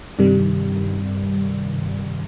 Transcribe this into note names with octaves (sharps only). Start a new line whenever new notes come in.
G2 C3 D#3 G3